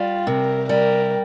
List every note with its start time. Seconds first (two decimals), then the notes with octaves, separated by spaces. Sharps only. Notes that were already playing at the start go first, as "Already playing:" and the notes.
Already playing: G3 F4
0.27 C3 A#4
0.69 G3 A#4